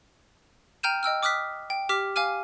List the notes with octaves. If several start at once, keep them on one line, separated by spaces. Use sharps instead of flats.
G5 A#5 F6 G6 D#7 E7
D#5 G5 E6 F6
D6 D#6 F6 F#6 B6
G5
G4 D6 F6 B6
F5 G#5 D6 F6 D#7